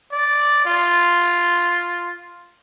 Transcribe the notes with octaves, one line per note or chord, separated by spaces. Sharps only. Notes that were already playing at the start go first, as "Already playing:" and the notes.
D5
F4